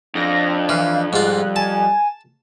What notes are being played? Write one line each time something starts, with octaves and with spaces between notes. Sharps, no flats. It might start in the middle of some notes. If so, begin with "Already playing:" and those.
F2 D4 A#6
E3 F5
G#2 G3 F4 F#6
G#5 A5